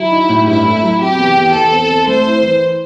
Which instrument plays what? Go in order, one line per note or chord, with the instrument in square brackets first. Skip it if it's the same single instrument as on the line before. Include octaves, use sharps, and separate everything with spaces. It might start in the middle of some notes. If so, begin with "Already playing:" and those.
Already playing: [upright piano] F#3 [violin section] E4
[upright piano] D#4
A2
[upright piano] G2 [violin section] E4
[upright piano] A3
F#3
[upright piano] C3 [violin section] G4
[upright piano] E2
E2
[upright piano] E2 [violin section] A4
[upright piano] C4
C4
[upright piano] A3 [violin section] C5
[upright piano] E4
E3